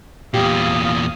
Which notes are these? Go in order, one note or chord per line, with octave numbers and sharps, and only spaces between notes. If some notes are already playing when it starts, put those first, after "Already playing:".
E2 A#2 G4 F5 D#6